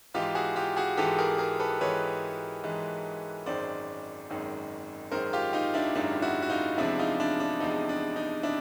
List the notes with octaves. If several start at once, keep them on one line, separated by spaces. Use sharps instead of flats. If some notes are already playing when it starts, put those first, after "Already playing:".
G#2 E3 G#3 F4 G4
F#4 G#4
F4 G4
F#4 G#4
G#2 E3 G#3 G4 A4
G#4 A#4
G#4 A#4
A4 B4
G#2 E3 G#3 B4 C#5
G#2 E3 G#3
G#1 F#2 D#3 G#3 C5 D5
G#1 F#2 D#3 G#3
G#1 F#2 D#3 G#3 A#4 C5
F4 G4
D#4 F4
D4 E4
G#1 F#2 D#3 G#3 D4
E4 F#4
F#4
D#4 F4
E2 C3 F3 G#3 D4 E4
D#4 F4
D4 E4
D4
E2 C3 F3 G#3 D#4
D4
D#4
C3 D4 E4